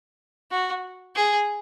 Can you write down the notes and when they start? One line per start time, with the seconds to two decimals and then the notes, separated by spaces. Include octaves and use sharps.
0.51 F#4
1.15 G#4